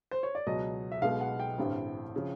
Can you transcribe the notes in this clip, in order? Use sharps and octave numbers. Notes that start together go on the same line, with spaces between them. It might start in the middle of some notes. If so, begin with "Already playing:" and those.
C5
C#5
D5
C#2 B2 F#3 D#5
E5
B1 B2 G#3 B3 F5
F#5
G5
A1 G2 D3 G3 C4
C#3 F3